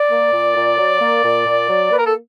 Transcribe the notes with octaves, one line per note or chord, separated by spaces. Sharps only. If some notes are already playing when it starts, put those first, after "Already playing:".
Already playing: D5
A#3
A#2
A#2
F#3
A#3
A#2
A#2
F#3
A#3 B4
A#4
A4